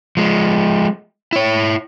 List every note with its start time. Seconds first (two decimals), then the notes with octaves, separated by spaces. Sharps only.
0.17 F3 G#3
1.33 E4 C#5